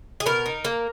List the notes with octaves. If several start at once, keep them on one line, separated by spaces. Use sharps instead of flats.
G#4
B2 A#4
D#4
A#3